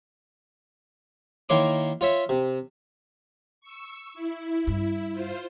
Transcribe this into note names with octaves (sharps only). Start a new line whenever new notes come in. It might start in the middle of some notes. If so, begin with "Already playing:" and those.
D#3 A#3 E4 C#5 C6 D6
F4 C#5 E5
C3
C#6 E6
E4
G2 C#3
F4 C5